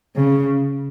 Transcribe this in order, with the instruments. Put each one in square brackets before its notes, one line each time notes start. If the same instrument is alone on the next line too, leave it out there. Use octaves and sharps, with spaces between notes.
[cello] C#3